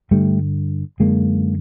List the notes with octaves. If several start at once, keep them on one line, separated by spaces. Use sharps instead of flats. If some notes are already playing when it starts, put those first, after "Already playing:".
G2 D3 G3 A3
F#2 D3 G#3 A#3